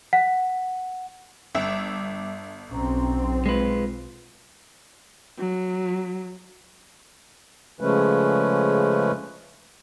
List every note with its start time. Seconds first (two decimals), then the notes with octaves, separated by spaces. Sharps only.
0.13 F#5
1.55 G1 G3 E5 D6
2.71 B1 C4 C#4 A#5
3.46 G#3 F4 B4
5.38 F#3
7.81 C#3 F3 G#3 A3 C#4 B4